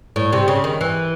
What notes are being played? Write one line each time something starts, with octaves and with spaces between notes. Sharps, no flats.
A2
C3
C#3
D#3
E3